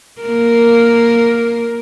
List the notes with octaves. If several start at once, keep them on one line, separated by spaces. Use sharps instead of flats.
A#3 A#4